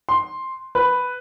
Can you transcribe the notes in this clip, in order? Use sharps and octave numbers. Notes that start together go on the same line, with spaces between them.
C6
B4